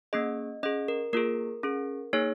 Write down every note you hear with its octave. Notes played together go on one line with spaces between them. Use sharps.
A#3 C#4 G#4 D#5
C#4 G#4 D#5
A#4
A#3 F4 G#4 A#4
C#4 G#4
A#3 D#4 G#4 C#5